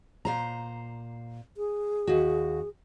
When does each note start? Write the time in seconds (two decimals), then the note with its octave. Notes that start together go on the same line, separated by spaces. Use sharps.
0.25 A#2 C5 A#5
1.57 G#4
2.07 D#2 F#4